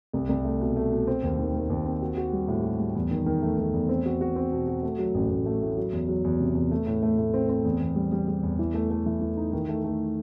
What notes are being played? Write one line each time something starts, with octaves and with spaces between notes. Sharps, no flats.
C2
C2
A3
B2
A3
B2
C4
D#2
D#3
D#3
D#2
C4
F#4
F#4
G3
A2
F#4
G3
E2
D#3
D#3
A3
D#3
E2
C4
F#4
F#4
C4
B2
F#4
A3
F#3
A1
A1
A3
A2
F#3
E2
F#3
E2
C3
E2
A3
A2
A3
A2
C4
C4
E2
E2
G3
G3
G3
E2
E3
A3
A3
E3
E3
D#4
D#3
A3
A3